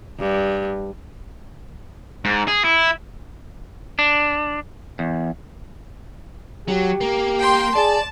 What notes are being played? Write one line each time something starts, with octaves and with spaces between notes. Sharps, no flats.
G2
G#2
G#4
E4
D4
E2
F#3 G4
A#3
G5 C6
G#4 D5 A5